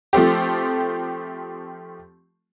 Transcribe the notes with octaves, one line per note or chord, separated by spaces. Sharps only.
F3 A3 C4 G4